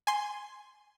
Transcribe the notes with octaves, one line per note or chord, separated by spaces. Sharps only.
G#5 C6